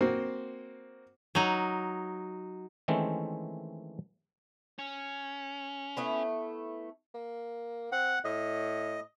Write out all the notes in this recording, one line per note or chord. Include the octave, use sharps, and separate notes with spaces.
A#3 C4 F#4 C5
F#3 D#4
D#3 E3 G#3 A3 C4 C#4
C#4
A3 B3 E4
A#3
C4 F#5
A2 D#5